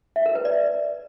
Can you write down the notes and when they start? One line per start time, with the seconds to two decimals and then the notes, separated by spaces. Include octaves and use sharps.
0.16 E5
0.26 A#4
0.35 B4
0.45 D5